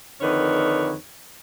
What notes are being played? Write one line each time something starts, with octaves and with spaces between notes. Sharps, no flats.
F2 D3 D#3 B4 C#5